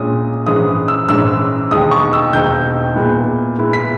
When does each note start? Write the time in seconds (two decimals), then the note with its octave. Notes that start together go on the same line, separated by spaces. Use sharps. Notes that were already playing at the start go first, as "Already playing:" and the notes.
Already playing: A#1 A#2 G#3 C#4 D#6
0.46 A#1 G#2 E3 G#3 C#4 D#6
0.88 E6
1.08 A#1 G#2 E3 G#3 C#4 E6
1.71 E1 D#2 D#3 G#3 D#4 D#6
1.91 C#6
2.13 E6
2.33 E1 D#2 D#3 G#3 D#4 G6
2.95 A#2 G#3 B3 E4
3.58 A#2 G#3 B3 E4
3.73 B6